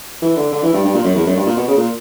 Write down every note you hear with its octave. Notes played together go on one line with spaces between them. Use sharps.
E3
D3
D3
E3
G2
G2
A#2
F#2
E2
F#2
G2
A#2
B2
C#3
A#2